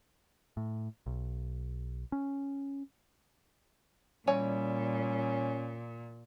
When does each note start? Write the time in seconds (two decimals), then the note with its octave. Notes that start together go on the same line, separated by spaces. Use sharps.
0.57 A2
1.06 B1
2.12 C#4
4.27 A#2 E3 G3 C#4 C#5 G#5